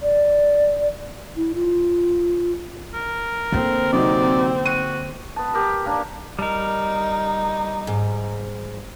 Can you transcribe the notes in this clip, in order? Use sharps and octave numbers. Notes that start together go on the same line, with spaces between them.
D5
E4
F4
A#4
D3 A#3 C4
C3 F#3 D#4 D5
F#4 D#7
B3 A5
G4 A#4
A#3 D4
G3 D#4 A#4
G#2